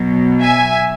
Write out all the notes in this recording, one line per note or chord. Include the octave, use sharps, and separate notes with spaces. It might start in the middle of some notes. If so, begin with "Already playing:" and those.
Already playing: B2 F#3
E5 G#5